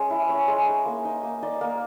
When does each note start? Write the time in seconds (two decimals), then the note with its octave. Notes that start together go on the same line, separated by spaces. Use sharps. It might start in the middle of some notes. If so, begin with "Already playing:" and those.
Already playing: G#3 C#4
0.10 E4
0.29 C#4
0.48 G#3
0.67 D#4
0.86 A#3
1.05 D#4
1.23 A#3
1.43 D#4 D5
1.61 A#3